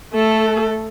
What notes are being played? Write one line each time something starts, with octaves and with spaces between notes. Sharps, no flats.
A3 A4